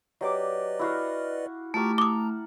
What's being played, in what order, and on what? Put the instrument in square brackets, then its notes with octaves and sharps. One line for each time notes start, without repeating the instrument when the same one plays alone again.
[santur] F#3 G4 D6 [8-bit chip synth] B4 D5 D#5
[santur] E4 F#4 F5
[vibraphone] A3 [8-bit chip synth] F4 A#5 C#6 [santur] G4 A#4 A5
[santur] F#5 [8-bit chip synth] A#5 [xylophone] D6 D#6